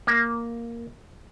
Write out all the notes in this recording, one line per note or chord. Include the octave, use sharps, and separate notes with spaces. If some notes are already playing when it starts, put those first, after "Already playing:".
A#3